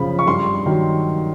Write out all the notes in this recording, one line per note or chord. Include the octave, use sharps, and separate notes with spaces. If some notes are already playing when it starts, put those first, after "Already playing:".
Already playing: F#2 C#3 F3 B5
C#6
G2 C6
D#3 F#3